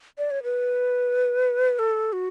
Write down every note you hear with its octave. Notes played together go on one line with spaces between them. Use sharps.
D5
C#5
B4
A4
F#4